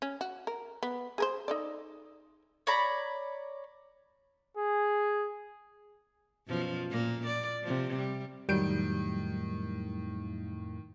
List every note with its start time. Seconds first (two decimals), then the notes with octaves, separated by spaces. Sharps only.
0.02 C#4
0.21 F#4
0.47 A#4
0.83 B3
1.18 G#4 A#4 C5
1.48 D#4 A4 D5
2.67 C#5 D5 A#5 B5
4.57 G#4
6.48 F#2 B2 F3
6.90 A#2 A#3
7.27 D5
7.62 C3 F3
7.97 G3
8.49 F2 A2 D#3 F#3 G3 G6 D7